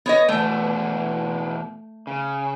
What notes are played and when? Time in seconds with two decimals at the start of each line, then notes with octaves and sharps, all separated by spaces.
0.06 B3 C#5 D#5
0.29 E2 B2 A3 D4
2.07 C#3